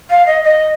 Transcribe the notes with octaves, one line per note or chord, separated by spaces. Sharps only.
F5
D#5
D#5